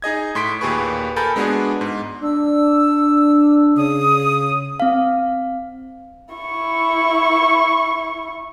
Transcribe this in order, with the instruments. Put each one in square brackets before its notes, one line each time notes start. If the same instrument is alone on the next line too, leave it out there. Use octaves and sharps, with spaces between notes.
[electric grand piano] D#4 G#4 D#5 G#6
A2 C6 B6 D7
D#2 A#2 G4 G#4 B4 C#6
A4 A#4 G#5 B5 G6 A6
G#3 B3 D4 F#4 G#4
G#2
[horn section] D4 [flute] E6
[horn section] C#3 [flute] D#6
[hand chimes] C4 F5
[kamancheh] E4 C#6